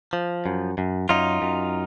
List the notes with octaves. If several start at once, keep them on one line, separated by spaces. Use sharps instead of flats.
F3
F#2
F#2
F#2 D#4 F4
F#2